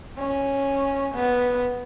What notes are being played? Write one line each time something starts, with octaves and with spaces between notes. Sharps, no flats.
C#4
B3